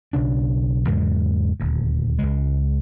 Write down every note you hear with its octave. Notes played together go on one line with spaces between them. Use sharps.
B1 C#3 D4
E2 G#2 C#3 G#3
D#1 D2
C#2 G#3